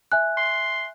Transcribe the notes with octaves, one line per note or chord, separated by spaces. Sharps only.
E5 G#5 F#6
C6